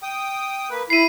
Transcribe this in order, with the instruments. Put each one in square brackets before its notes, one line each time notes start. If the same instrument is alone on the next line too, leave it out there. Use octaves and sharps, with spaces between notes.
[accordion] G5 D#6
A#3 B4
[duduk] E4 [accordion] B5 [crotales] C7 D#7